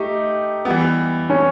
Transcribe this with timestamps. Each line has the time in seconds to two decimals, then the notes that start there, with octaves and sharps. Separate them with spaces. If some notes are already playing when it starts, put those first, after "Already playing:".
Already playing: A3 D#4 G4
0.65 E3 G3 B3
1.30 C#4